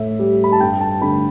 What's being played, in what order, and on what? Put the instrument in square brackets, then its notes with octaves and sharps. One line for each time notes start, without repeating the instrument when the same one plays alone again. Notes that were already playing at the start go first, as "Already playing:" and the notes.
Already playing: [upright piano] A2 E5
G3
B5
A5
G2 G5
A5
D3 A3 B5